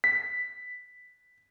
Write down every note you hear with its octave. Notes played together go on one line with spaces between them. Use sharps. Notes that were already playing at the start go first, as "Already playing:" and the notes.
B6